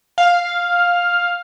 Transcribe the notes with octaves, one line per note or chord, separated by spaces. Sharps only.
F5